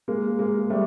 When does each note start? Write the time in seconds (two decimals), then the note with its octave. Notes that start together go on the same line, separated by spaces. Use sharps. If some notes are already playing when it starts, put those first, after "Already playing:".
0.08 G#3 A#3
0.39 G#3 A#3
0.70 G3 A3